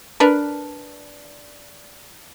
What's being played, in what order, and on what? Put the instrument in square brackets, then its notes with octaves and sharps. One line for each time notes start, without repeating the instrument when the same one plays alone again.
[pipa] D4 A#4 B4